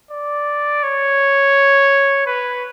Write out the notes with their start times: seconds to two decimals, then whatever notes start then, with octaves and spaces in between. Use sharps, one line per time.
0.11 D5
0.83 C#5
2.27 B4